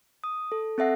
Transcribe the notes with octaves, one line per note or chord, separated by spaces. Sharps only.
D#6
A4
C4 A4 E5 F#5